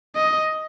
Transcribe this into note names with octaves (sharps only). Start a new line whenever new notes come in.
D#5